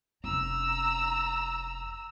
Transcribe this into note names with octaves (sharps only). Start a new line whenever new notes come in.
F1 C#4 A#5 E6